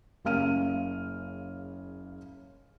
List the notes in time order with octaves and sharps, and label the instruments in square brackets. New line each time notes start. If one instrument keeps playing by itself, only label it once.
[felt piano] F#1 C#3 F5 F6 D#7